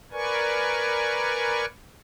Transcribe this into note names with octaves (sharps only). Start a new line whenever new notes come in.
A#4 B4 D5 G#5 C#6